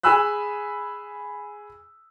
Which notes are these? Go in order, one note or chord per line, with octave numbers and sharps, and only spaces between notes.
G#4 G#5 B5 E6 F#6